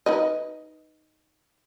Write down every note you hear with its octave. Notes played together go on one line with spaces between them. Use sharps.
D#4 B4 D#5